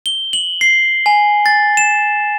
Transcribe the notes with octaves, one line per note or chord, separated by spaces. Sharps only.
G7
F#7
C7
G#5
A6
E7